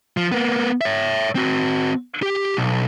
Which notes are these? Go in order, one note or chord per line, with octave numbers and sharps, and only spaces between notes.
F3
A#3 B3
C#5 E5
C4 F#4
G4
B1